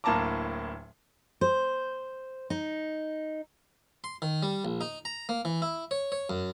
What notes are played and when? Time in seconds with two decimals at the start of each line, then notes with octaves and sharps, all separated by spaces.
0.04 D1 A2 A#3 A5 A#5 D6
1.41 C5
2.50 D#4
4.04 C6
4.22 D#3
4.43 G3
4.65 A#1
4.81 D#4
5.05 A#5
5.29 A#3
5.45 E3
5.62 E4
5.91 C#5
6.12 C#5
6.29 F#2